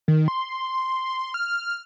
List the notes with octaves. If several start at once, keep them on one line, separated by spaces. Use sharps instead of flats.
D#3
C6
F6